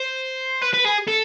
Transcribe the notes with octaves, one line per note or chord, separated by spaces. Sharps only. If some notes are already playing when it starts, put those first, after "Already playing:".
Already playing: C5
B4
B4
G#4
A4